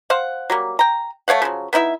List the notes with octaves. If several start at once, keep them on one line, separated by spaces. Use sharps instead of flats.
C5 F5 F#5
F#3 G3 A#3
G5 A#5
A3 C#5 F5 F#5
C#3 F3 F#3
B3 D#4 E4 E5